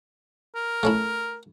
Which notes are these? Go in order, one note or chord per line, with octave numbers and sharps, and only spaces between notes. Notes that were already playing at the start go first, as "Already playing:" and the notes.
A#4
A3 C#4 E4